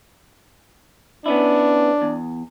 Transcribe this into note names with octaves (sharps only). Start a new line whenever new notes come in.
B3 C#4 D4 E4
E2